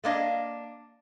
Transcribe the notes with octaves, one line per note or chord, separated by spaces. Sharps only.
A3 A#3 D4 D#5 F5